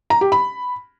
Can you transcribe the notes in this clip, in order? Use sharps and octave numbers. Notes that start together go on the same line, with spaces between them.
A#5
G4
B5